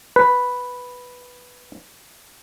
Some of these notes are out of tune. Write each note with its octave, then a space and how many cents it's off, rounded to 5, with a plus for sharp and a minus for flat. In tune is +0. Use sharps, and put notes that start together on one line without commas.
B4 +0